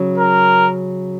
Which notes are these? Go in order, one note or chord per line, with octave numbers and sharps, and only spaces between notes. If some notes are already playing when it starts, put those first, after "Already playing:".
Already playing: C#3 F#3
A#4